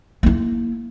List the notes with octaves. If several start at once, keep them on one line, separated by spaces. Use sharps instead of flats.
A#3 E4